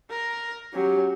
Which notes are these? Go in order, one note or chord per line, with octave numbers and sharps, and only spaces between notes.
A#4
F#3 C#4 G4